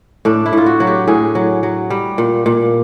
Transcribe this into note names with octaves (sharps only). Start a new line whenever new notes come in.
A2 D4
E4
A2 F4
F#4
F#3
G4
A2 G#4
F#3
F#3
G3
A#2
A#2